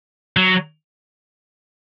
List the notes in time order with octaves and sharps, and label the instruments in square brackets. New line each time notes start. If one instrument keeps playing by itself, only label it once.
[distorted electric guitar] F#3